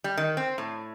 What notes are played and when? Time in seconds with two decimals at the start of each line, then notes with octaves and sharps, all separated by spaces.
0.04 G3
0.17 D#3
0.37 C4
0.58 A2